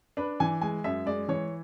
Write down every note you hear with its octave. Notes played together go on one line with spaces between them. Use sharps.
D4 B4
E3 G#5
G#3 G#5
F#2 E5
G#3 D5
E3 C#5